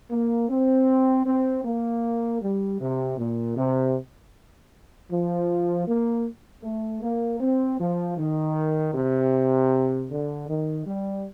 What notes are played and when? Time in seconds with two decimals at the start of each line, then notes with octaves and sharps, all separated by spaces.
0.11 A#3
0.49 C4
1.26 C4
1.64 A#3
2.42 G3
2.80 C3
3.18 A#2
3.56 C3
5.11 F3
5.87 A#3
6.63 A3
7.02 A#3
7.40 C4
7.79 F3
8.17 D#3
8.94 C3
10.10 D3
10.48 D#3
10.86 G3